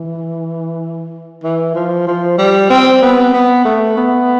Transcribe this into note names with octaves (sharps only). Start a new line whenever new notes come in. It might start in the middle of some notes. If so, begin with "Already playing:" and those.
Already playing: E3
E3
F3
F3
G3
C4
B3
B3
A3
B3